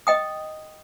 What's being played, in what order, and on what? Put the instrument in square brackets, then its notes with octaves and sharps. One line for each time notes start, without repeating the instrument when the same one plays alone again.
[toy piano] D#5 G5 D#6